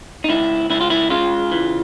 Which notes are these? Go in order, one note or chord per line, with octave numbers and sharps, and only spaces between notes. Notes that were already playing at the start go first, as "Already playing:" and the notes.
D#4
C#2 E4
C#2 E4
F4
E4
C#3 F4
E3